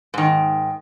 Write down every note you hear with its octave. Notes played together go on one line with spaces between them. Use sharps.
G#2 D#3